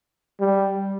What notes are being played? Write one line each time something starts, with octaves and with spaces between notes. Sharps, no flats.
G3